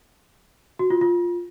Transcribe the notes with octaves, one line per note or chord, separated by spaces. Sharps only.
F#4
F4
F4